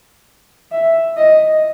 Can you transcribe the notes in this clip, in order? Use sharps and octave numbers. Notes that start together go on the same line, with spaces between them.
E5
D#5